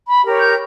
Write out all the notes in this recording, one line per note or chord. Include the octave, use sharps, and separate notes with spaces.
B5
G4 A#4 C#5
G6